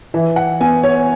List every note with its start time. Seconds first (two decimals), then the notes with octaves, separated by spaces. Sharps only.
0.14 E3 E5
0.36 F#5
0.60 B3 G#5
0.83 C#5